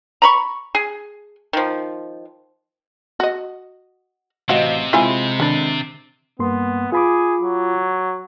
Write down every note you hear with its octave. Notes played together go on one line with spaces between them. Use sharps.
A#5 B5 C#6
G#4
D#3 F3
F#4 D#5
A1 C3 F#4 C5 D#5 F5 D7
G#3 C4 E4 F4 G#5 B5
D3 D#3 D4 B5 A6
G2 A#3 B3 C6
F4 G#4 B5 D6
F#3